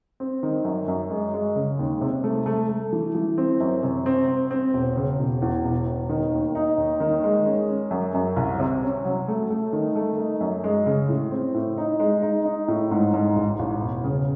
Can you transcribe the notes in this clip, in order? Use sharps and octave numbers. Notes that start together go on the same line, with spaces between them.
C4
D#3
F#2
F#2
G#3
G#3
C#3
D#2
C3
A3
A3
A3
E3
E3
C4
F#2
C3
C4
C4
C4
E1
C#3
E1
E2
E1
E1
D#3
D#2
D#4
D#2
D#3
G#3
C#4
C#4
F#2
F#2
C2
C3
C#4
F#3
A3
A3
D#3
A3
D#4
F#2
G#3
C#3
A2
C4
A2
D#4
G#3
D#4
D#4
A2
G#2
G#2
A1
A1
E1
C#3